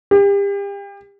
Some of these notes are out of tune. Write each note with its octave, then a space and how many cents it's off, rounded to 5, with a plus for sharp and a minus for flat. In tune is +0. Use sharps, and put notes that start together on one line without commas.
G4 +35